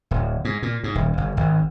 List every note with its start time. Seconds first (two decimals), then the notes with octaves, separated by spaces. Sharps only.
0.11 D1
0.45 G#2
0.63 A#2
0.84 G#2
0.95 D#1
1.18 G1
1.37 G#1